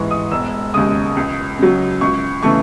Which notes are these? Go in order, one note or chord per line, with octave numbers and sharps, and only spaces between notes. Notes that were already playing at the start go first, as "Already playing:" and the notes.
Already playing: A1 G#2 E3 G#3 C#6
D#6
E1 E6
D#2 C#3 G#3 D#6
C#2
C#3 F#3
C#2 C#6
C#3 E3 A3 C#6